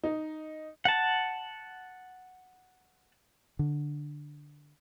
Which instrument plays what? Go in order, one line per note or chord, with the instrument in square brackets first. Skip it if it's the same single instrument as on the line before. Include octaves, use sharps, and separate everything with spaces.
[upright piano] D#4
[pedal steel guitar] F#5 A5
[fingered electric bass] D3